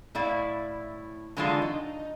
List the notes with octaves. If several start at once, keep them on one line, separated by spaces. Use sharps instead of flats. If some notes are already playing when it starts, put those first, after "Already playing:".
A2 E4 D5 F5
D3 E3 F#3 G#3 D4 F4
D#4